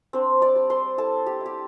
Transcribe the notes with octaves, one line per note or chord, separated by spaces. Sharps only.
C4 D4 C5
D5 D6
G3
C5 C6
E4 A4 A5
G4
E4
G4